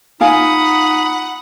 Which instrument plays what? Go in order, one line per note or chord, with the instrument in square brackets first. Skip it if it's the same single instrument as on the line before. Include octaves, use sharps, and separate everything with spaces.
[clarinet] D#4 [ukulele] F4 F5 G#5 [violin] F#5 [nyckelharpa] B5 D#6